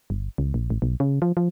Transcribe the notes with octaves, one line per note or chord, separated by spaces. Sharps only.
G1
C#2
A#1
A1
B1
C#3
F3
F3